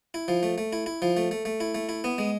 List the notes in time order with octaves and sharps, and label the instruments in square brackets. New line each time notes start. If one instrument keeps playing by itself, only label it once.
[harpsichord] E4
F3
A3
A3
E4
E4
F3
A3
A3
A3
E4
A3
E4
B3
G#3